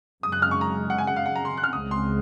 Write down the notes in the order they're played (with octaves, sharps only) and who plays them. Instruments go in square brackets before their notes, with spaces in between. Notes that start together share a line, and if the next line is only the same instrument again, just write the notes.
[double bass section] F#2 C#3 G#3 [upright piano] D#6
[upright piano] F#6
F6
C#6
A#5
F#5
G#5
F#5
F5
F#5
A#5
C6
F#6
F6
[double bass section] C#2 C#3 G#3 C4 [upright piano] D#6
[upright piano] C6